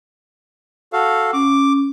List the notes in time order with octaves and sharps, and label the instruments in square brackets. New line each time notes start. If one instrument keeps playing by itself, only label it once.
[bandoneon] F#4 A4 F5
[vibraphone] C#4 [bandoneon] D6